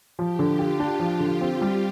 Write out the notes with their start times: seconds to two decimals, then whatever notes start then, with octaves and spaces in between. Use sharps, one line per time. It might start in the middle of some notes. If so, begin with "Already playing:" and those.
0.18 F3 G4
0.39 D3
0.49 F4
0.59 G4
0.80 D4
1.00 F3
1.20 D3
1.41 C4
1.61 G3